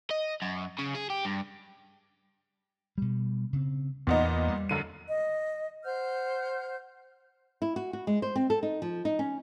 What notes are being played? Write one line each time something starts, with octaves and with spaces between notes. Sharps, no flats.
D#5
F#2
C#3
G#4
G4
G2
B2 G3
C#3 C4
E2 A#2 B3 D#4
G3
F#2 D3 D#7
D#5
C5 F#5 F6 G6
E4
F#4
F#4
G#3
C5
C4
A4
D#4
F3
D#4
C#4